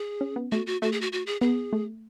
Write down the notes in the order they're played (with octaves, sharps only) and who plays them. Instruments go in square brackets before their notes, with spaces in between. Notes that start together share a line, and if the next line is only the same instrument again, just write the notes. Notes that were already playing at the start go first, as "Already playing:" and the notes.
Already playing: [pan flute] G#4
[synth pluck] C#4
B3
[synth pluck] A3 [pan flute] F#4
[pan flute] F#4
[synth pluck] A3 [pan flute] F#4
[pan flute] G#4
F#4
F#4
G#4
[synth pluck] B3 [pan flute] G#4
[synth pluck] A3